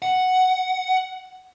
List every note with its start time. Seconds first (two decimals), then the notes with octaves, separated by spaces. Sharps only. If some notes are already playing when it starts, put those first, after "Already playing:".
0.02 F#5